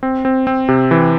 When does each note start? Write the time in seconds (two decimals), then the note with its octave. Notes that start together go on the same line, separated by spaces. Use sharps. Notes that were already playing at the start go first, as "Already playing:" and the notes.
0.03 C4
0.25 C4
0.47 C4
0.68 C3
0.91 E3